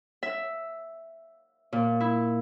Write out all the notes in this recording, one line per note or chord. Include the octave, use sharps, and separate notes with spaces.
E5
A#2
E4